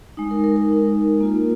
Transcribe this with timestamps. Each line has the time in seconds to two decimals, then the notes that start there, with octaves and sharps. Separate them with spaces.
0.17 G#3 D#4
0.31 A#4
0.44 A#4
0.56 A#4
0.69 G#3 D#4
1.20 A#3 F4